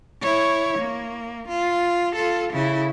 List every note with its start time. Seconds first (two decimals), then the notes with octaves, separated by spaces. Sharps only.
0.22 E4 C#5
0.78 A#3
1.48 F4
2.16 F4 A4
2.53 C#3 E4